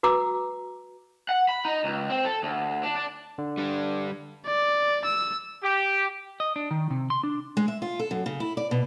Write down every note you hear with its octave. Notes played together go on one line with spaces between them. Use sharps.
F#4 B4 A#5 D6 E6
F#5
B5
D#4
C#2
C4
A4
D2
D4
D4
D3
G3 D4
D5
E6
G4
D#5
D4
D#3
C3
C6
D4
G#3
E5
F4
A4
F#2
C#3
E4
D5
B2